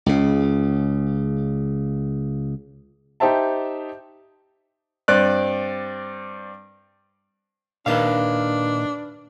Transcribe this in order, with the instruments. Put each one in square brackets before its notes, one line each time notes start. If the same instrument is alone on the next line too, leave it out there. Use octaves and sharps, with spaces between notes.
[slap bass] C#2 C#3
[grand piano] D#4 G4 C5 E5 A5
[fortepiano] G2 C4 D5 F#6
[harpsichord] D#2 D#3 A5 [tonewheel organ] A#2 [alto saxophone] D4 [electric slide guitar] B4 E5 F5